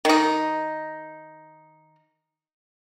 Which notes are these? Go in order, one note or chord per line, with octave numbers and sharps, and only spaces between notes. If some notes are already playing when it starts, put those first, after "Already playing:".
D#3 D#4